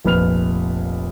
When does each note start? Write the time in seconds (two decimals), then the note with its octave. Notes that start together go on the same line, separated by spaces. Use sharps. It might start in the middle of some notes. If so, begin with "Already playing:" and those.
0.05 F1 A#1 B4 F6 F7